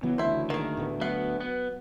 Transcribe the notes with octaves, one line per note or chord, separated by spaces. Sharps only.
C#3 E3 F#3 B3
D2 E4 C5
D#3 A#3 G#4
A2 A3 B3
F#3 B3 F5
B3